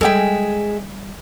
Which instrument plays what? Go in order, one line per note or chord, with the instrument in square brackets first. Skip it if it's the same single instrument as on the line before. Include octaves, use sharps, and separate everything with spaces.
[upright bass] G3 [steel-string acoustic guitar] G#3 G#4 E5 [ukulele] A4 G5